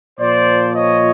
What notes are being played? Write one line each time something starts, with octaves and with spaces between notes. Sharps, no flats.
A#2 F3 C5 D5
C#5 D#5